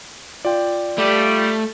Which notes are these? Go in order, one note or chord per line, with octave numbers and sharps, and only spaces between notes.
F4 D5 G5
G3 A3